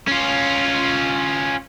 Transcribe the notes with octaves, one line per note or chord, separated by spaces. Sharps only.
C#4 F4